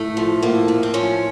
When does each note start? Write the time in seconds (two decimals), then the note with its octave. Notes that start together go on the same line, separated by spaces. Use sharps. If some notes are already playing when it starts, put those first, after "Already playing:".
Already playing: A2 A3
0.17 F3
0.42 A2 A#3
0.68 A2
0.83 C4
0.94 F3 C#4